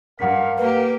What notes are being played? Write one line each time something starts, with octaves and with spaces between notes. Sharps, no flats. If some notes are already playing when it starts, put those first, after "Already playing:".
G2 A#4 F5 F#5 B6
A#3 G4 B4